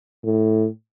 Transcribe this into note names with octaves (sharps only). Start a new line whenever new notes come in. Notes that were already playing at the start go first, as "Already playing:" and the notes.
A2